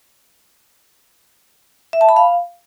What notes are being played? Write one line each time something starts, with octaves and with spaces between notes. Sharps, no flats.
E5
A5
B5
F5